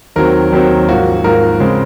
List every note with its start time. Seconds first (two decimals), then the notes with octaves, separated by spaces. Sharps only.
0.16 D#2 D#3 F#3 C4 A#4
0.52 D#2 D#3 F#3 C4
0.89 G#2 F3 A#3 F#4
1.24 G#2 F3 A#3 A#4
1.60 C#3 G#3 C4